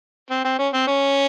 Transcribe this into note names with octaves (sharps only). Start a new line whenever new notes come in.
C4
C4
C#4
C4
C#4